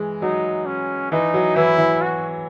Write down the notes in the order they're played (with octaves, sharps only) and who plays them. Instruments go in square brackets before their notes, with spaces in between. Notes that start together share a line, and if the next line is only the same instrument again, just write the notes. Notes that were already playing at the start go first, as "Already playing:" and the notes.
Already playing: [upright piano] E3 G#3
[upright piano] F#3 [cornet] D#4
[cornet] C#4
[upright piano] E3 [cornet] D#4
[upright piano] F#3
[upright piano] E3 [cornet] E4
[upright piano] E3
[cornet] F#4